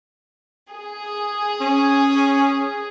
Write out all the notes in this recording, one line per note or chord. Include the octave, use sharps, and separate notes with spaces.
G#4
C#4